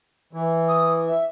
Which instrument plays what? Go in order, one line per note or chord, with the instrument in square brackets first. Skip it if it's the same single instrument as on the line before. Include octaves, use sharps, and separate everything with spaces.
[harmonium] E3
[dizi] D#6
E5